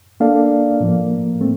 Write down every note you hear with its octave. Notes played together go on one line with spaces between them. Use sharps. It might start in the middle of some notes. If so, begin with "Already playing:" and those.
A#3 D4 A4 D5 F5
A2 F3 A#3
A3 C4